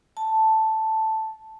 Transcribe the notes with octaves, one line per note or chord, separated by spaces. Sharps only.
A5